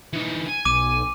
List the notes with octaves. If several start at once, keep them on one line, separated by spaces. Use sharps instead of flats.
E3 D#4
G#5
B1 D6 D#7